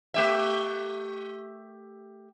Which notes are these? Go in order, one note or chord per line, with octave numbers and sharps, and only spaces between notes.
A3 G4 E5